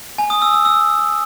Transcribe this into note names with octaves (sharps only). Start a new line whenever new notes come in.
G#5
D#6
E6
E6
E6